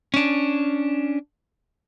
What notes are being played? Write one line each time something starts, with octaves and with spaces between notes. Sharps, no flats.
C#4 D4